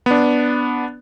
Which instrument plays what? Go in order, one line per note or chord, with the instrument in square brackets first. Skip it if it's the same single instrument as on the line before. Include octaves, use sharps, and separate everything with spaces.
[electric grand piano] B3 D4